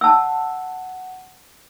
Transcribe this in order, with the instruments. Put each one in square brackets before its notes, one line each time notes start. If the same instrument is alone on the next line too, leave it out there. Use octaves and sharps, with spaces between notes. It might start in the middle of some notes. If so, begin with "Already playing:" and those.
[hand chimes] F#5 [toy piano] A5 E6